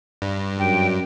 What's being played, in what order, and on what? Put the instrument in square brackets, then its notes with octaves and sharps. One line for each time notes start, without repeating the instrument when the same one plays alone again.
[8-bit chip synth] G2
[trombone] F#2 [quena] G5